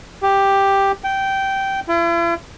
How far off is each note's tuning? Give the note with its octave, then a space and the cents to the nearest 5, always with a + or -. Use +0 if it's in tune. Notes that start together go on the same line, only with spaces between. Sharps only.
G4 +5
G5 -15
E4 +45